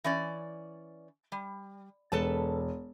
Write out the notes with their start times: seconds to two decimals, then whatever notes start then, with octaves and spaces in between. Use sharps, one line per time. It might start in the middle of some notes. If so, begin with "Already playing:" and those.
0.04 E3 C#4 D5
1.32 G3
2.12 E1 A4 B4 A5